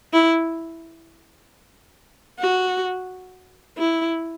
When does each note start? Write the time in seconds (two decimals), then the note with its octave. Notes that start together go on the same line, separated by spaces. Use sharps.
0.13 E4
2.40 F#4
3.78 E4